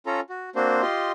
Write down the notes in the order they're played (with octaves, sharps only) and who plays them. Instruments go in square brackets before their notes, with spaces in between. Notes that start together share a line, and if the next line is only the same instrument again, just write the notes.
[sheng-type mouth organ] C#4 F4 A4 A#5
F#4
A#3 C4 D4 F#4 C5
F4 G4 D#5 C6